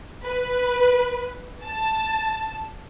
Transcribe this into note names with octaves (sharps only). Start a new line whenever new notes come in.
B4
A5